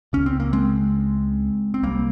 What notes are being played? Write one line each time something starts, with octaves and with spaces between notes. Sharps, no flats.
C#2 C#3 C#4
C4
A#3
G#3 C4
C4
C2 C3 G3 A#3